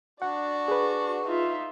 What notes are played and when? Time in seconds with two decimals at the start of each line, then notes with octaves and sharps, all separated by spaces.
0.22 D4 F#4 D5 F#5
0.68 G#4 B4
1.26 D#4 F4 E5